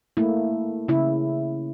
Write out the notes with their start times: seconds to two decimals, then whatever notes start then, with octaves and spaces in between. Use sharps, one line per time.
0.17 A3 A#3 E4
0.88 C#3 E4